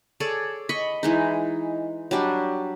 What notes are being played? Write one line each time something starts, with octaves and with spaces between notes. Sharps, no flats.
G#4 A4 C#5 D5
D#5 B5 C#6
E3 G#3 D#4
F#3 G3 D4 G4